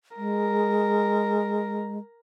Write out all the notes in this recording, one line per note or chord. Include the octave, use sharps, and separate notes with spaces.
G#3 A#4